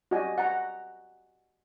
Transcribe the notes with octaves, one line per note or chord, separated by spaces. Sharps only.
F#4 G4 D5 D#5 G#5
F#5 A#5